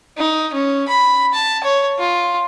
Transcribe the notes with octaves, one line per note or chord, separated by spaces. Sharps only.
D#4
C#4
B5
A5
C#5
F4